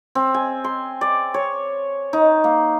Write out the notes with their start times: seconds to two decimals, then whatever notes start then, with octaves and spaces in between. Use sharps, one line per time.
0.15 C4
0.34 G#5
0.64 C6
1.01 D5
1.34 C#5
2.13 D#4
2.44 A#3